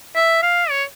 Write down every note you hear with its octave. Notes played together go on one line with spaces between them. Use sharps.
E5
F5
C#5